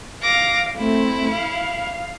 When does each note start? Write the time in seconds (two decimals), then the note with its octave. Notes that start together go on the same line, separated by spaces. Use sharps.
0.22 F5 D6 A#6
0.77 A3 C4 E4
1.32 F5